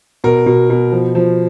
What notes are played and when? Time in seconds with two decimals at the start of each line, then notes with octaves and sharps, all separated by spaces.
0.24 B2 A#4
0.46 B2
0.70 B2
0.92 F3
1.15 F3